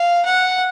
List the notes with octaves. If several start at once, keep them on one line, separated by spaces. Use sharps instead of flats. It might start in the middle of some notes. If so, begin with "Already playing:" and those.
Already playing: F5
F#5